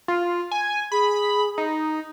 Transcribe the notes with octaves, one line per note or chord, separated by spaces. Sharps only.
F4
G#5
G#4 B5
D#4